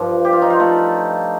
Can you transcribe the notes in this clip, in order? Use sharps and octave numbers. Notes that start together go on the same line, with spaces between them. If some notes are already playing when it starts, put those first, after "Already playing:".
Already playing: G2 F3
G4
F4
D#4
F4
A3